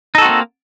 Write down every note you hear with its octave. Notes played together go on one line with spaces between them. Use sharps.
A#3 C4 D#4 F#4 A4